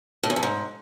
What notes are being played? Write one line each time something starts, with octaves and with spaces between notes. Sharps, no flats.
A2
E2
F2
G#2